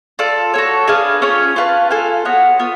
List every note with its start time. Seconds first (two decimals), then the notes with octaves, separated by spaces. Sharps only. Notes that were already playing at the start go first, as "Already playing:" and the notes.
0.19 F4 A4 D5
0.54 F#4 A4 C#5
0.87 D4 G#4 B4 F5
1.22 C#4 F4 G#4 C#5
1.56 F4 B4 F5 A5
1.90 F4 A4 F5 G#5
2.25 B3 F#4 C#5 F#5
2.60 B3 F4